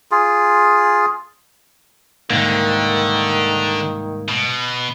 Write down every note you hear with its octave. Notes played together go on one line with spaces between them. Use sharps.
F4 G#4
C2 G#2 D3 D#3 A#3
B2